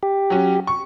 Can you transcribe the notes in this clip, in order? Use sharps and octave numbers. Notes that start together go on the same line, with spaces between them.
G4
F#3 C#4
C#6